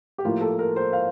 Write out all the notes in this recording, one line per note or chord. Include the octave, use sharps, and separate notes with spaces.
G4
A2 F3 A#3 F4
A4
A#4
C5
F5